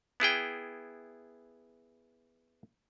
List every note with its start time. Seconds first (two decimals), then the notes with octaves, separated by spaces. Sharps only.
0.20 B3 E4 G#4 G5